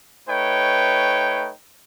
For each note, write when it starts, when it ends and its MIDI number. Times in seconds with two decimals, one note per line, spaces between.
0.28 1.52 57
0.28 1.52 63
0.28 1.52 71
0.28 1.52 73
0.28 1.52 79